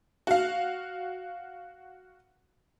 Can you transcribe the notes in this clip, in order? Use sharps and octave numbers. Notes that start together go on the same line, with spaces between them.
F#4 F5